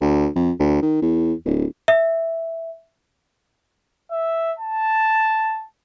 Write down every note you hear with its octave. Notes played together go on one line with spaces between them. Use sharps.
D2
F2
D2
D#3
E2
D1
E5
E5
A5